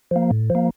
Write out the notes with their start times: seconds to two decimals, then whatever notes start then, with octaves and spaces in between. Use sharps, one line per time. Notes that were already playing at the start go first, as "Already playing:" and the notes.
0.11 F3 A#3
0.31 A2
0.50 F3
0.55 A#3